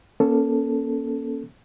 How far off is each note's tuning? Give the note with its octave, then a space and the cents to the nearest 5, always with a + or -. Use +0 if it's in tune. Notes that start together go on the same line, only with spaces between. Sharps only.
A#3 +30 C#4 +0 A4 +0